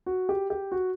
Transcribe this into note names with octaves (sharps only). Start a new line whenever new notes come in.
F#4
G4
G4
F#4